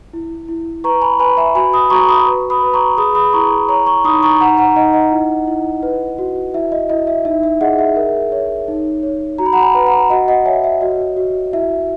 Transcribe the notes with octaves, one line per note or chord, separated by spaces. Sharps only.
E4
E4
B4 A#5 C#6
G#5 B5
B4 G#5 B5
E5 G#5
F#4 G#5 B5
B5 D#6
F#4 A#5 C#6
B5 D#6
B4
B5 D#6
B4
A#5 C#6
G#4 B5 D#6
B5 D#6
E4 A#5 C#6
C#5 A#5 C#6
A#5 C#6
D#4 B5 D#6
A#5 C#6
D#4 F#5 A#5
F#5 A#5
D#4 D#5 F#5
D#5 F#5
E4
E4
B4
F#4
E4 E5
D#5
E4 D#5
E5
D#4 E5
E5
G#4 D#5 F#5
E5
A#4
C#5
D#4
C#5
F#4 A#5
B5
F#5 A#5
G#5 B5
B4
F#5 A#5
F#4 D#5 F#5
D#5 F#5
C#5 E5 G#5
E5
F#4 D#5
F#4
E4 E5